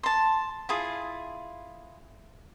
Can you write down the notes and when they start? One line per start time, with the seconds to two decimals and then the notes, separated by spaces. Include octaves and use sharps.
0.03 A5 C6
0.69 E4 F4 G#4